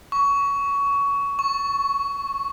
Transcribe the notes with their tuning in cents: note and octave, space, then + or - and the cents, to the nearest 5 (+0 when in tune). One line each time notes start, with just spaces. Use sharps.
C#6 +20
C#6 -10